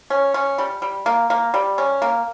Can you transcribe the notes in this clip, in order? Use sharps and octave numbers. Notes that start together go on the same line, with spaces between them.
C#4
C#4
G3
G3
A#3
A#3
G3
C#4
A#3